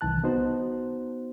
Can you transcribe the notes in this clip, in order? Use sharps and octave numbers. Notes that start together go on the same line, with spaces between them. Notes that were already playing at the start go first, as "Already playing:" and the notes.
C2 D#3 E3 A5 F#6
B3 D#4 F#4 C5